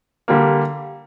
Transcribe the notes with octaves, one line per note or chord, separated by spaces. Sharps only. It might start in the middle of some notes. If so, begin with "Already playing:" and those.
D3 G3 A#3